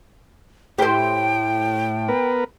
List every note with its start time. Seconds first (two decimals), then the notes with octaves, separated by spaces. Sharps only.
0.79 A2 G4 C5 G5
2.08 B3 A#4 B4